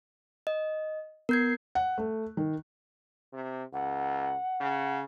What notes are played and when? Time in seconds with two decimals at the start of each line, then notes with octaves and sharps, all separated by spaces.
0.47 D#5
1.29 B3 A#4 G6 G#6 C7
1.75 F#5
1.98 A3
2.37 D#3
3.33 C3
3.73 C#2 F#5
4.61 C#3